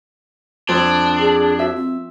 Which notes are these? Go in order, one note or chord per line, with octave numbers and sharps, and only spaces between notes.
F2 D4
G#4
F#4 E5
C4